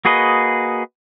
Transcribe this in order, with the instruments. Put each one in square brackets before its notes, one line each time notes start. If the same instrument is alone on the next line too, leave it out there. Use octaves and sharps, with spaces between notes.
[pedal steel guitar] A#3 F#4 G#4 B4 D#5